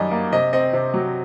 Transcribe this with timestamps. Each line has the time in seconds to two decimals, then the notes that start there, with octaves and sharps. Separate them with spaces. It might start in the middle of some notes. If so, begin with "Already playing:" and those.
Already playing: F#2 D#3 G3 D5 D#5
0.11 A#3
0.32 C3 D#5
0.53 C4 D#5
0.73 C3
0.94 F#3